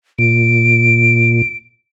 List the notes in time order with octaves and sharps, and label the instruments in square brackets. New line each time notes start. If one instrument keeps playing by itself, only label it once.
[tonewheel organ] A#2 [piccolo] D7